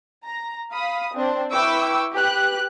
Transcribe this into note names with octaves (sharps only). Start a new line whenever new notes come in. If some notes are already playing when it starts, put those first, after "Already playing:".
A#5
F5 B5 D#6
C4 D4 C5
E4 B4 G5 C#6 D6 E6
G4 B4 F#6